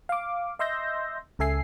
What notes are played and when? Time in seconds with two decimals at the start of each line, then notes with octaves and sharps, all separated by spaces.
0.09 F5 D6
0.59 D#5 E5 C6 E6 G6 A#6
1.39 C#2 C#3 A4 E5 G#5 C7